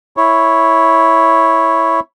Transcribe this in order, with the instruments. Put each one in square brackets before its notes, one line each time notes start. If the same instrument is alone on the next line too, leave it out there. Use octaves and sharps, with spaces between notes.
[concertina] E4 C#5